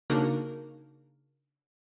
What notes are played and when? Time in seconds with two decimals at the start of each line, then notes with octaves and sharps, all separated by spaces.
0.10 C#3 A#3 D4 D#4 F#4 A#4